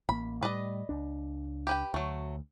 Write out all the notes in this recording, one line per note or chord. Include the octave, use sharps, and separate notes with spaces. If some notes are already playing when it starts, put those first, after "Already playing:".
A1 A#3 B5
A2 G3 B4 D5 D#5
C#2 D4
G4 B4 G5
D2 F#3 A3